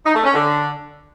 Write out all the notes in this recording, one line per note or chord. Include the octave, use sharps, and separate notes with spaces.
D#4
A3
C#4
D3